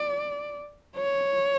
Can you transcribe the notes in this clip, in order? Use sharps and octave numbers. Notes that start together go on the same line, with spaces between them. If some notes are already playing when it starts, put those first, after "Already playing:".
Already playing: D5
C#5